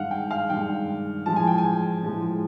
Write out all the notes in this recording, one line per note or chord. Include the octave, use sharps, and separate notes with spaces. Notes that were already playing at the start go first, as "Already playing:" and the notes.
Already playing: G2 D#3 G#3 F5 F#5
G5
F5
G2 D#3 G#3 G5
A2 F3 G#3 A5
G#5
G5
G#5
A2 F3 G#3